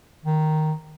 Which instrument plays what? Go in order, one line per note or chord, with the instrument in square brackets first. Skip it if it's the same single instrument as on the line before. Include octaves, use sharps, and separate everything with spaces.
[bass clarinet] D#3